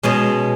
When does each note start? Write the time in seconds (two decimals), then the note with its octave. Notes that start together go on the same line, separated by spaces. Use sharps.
0.03 B2 G#3 C#4